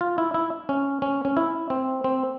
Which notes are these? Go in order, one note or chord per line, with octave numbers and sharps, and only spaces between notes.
F4
E4
E4
C#4
C#4
C#4
E4
C4
C4